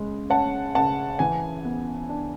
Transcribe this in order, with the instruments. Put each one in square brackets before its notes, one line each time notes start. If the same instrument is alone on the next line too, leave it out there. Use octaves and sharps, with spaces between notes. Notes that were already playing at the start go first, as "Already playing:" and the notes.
Already playing: [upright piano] C#3 G#3
C#4 F#5 A5
C#3 F#5 A5
E3 G#5
B3
D4